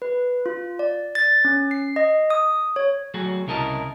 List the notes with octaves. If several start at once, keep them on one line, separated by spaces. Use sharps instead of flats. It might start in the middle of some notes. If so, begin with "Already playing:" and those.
B4
F4
D5
A6
C#4
C7
D#5
D#6
C#5
F#3 A3 F#4 G#4
C2 C#3 E4 A#4 D#5 A5